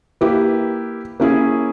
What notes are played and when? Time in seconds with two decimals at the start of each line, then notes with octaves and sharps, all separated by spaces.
0.21 A#3 E4 G4 B4
1.20 A#3 C#4 E4 G#4